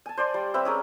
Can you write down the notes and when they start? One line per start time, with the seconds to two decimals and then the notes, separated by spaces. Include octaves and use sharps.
0.06 G#5 A5
0.17 C5 D5 C6
0.34 G3
0.54 G3 C4 B4 E5
0.65 C#4 G#4 A#4